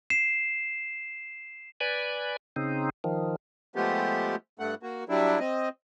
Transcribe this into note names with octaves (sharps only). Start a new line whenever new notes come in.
C7 E7
B4 D5 G#5
C#3 C4 D#4
D#3 F3
F3 G#3 A3 B3 G4
G2 A3 F#5
A#3 F#4
F#3 G3 D4 E4
C4 D#5